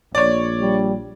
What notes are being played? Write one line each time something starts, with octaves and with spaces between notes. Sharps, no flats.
A#1 C#5 D5
G3